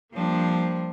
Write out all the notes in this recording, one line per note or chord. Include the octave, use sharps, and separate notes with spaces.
F3 G3 A#3 C4 D4